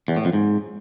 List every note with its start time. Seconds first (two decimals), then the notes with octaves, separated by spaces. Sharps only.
0.08 E2
0.17 A2
0.25 F2
0.33 G#2